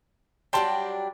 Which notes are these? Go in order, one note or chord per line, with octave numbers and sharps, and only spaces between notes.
F#3 G3 D4 G5 A5 C6